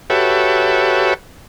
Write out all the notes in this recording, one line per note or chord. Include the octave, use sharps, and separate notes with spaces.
F#4 G4 A4 B4 C#5 E5